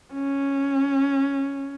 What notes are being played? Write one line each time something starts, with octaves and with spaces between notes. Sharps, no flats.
C#4